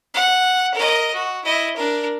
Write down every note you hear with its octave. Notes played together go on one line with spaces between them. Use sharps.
F#5
A#4 D#5
F#4
E4 D#5
D4 A#4